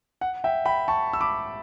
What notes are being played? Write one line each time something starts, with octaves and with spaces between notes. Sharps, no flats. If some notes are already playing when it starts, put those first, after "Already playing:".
F#5
E5 G5
G5 B5
A5 C#6
E6
B5 D6